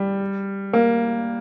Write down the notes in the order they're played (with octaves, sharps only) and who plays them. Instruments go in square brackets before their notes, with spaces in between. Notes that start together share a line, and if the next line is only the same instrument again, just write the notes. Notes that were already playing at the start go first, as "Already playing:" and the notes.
Already playing: [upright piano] G3
A#3